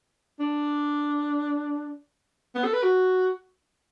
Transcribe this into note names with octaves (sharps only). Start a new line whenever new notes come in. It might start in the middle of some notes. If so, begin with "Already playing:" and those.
D4
B3
A4
B4
F#4